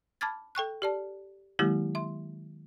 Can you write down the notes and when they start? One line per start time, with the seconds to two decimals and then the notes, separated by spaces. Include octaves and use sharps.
0.21 A5 B5 D6 F6 G#6 A6
0.55 A4 G5 C#6 F#6
0.82 G4 D5 A5
1.59 D#3 F#3 G#3 A#3 E4 G4
1.95 E5 C6